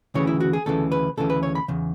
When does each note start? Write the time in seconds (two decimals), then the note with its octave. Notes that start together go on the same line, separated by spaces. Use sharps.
0.14 D2 C#3 E3 C#5
0.27 E4
0.40 F#4
0.53 G#4
0.66 D2 C#3 E3 A4
0.92 B4
1.17 D2 C#3 E3 A4
1.30 B4
1.43 C#5
1.55 B5
1.68 E2 C#3